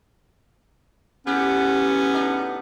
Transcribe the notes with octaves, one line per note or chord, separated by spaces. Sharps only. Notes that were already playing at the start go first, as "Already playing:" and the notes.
A2 C#3 B3 C#4 G4
D4 D#4